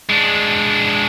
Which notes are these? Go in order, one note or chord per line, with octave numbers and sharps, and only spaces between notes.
G#3 D4